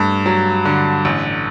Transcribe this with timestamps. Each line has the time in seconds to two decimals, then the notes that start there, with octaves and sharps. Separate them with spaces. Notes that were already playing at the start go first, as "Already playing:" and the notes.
Already playing: G2 A3
0.26 F#3
0.65 D3
1.05 A1